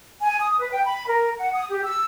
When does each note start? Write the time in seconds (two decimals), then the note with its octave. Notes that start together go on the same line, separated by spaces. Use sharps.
0.21 G#5
0.40 D#6
0.60 B4
0.72 G5
0.85 B5
1.07 A#4
1.39 F#5
1.54 D#6
1.70 G4
1.84 E6